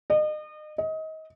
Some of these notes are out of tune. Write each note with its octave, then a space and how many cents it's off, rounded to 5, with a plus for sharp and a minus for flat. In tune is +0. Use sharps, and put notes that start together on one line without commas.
D#5 -35
D#5 +25